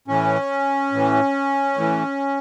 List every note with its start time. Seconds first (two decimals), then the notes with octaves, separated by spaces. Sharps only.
0.08 A2 E3 C#4
0.92 A2 E3
1.75 A2 E3